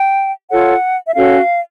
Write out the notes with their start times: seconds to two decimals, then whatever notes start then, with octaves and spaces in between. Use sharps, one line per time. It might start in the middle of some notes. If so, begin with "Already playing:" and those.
Already playing: G5
0.51 F4 A4 C#5 F#5
1.07 E5
1.15 C#4 F#4 A4 C#5 F5